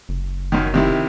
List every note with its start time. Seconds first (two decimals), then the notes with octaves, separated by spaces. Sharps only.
0.09 F#1
0.52 F#2 D#3
0.74 C3 D#3 E4